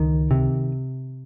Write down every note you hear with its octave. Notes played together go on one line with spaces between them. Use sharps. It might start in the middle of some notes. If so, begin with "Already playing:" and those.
Already playing: C#2 D#3
C3